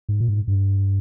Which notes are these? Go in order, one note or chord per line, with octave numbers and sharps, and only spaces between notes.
G#2
A#2
G#2
G2